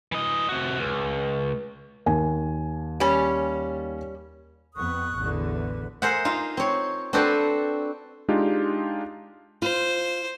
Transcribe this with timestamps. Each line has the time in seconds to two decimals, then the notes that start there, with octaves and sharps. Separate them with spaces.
0.12 E3 D#5
0.49 C3 F#4
0.79 C#2
2.06 D#2 G#5
3.00 G3 C#4
4.74 F2 B3 C#6 D#6 F#6
5.15 A1 E2 D3
5.53 B4
6.02 G#4 A#4 C5 E5 F#5
6.25 D#4 F4
6.57 C4 C#5
7.13 C4 D4 F#4 A4 B4 C5
8.28 G#3 D4 D#4 F4 G4
9.62 F4 C5